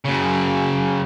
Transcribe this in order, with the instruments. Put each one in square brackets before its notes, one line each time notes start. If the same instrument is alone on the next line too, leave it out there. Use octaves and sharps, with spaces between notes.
[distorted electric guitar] F#2 C#3